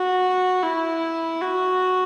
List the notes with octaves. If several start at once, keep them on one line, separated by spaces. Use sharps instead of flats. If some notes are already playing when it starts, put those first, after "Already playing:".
Already playing: F#4
E4
F#4